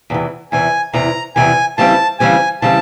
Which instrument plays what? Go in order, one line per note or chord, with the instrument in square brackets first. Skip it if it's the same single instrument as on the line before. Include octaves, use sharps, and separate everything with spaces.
[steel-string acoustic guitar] E2 C3 E3
[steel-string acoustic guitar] E2 C3 E3 [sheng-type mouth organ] G#5
[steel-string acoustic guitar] E2 C3 E3 [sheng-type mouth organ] A#5
[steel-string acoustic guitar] E2 C3 E3 [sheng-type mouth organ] G#5
[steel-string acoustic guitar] C#3 E3 G3 C4 [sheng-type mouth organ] A5
[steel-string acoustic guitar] C#3 E3 G3 C4 [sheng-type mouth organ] G#5
[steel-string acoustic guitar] C#3 E3 G3 C4 [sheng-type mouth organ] A5